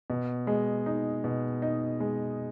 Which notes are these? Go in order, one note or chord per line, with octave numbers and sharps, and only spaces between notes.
B2
G#3
D#4
B2
D#4
G#3